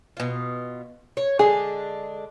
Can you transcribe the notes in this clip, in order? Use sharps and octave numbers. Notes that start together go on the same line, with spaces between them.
B2 F4
C#5
D3 G#3 D4 G#4